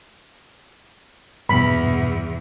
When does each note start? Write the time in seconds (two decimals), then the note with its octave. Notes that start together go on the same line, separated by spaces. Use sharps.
1.49 E2 G2 B2 B5